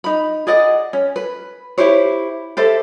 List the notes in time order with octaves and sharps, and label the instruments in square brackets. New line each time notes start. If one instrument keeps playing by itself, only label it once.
[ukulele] D#4 B5
G#4 D5 D#5 F#5
C#4
B4
E4 G4 C5 C#5
G4 A4 C5 E5